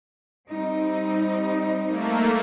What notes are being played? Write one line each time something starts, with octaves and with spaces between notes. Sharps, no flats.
G3 C4 D#4
A3 A#3